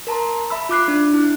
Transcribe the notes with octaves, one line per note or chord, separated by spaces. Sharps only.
A#4 A5 A#5 C6
E5 B5 E6
F4 D6 F#6 C7
D4
E4